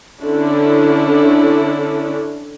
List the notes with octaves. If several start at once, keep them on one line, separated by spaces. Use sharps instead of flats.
D3 C#4 D4 E4